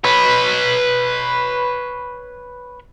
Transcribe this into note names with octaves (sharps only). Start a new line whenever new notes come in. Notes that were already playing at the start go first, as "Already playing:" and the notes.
B4 C#5